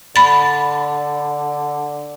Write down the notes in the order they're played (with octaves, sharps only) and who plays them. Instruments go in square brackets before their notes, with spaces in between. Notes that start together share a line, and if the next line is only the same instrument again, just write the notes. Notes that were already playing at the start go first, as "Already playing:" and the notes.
[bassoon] D3 [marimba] B5 A6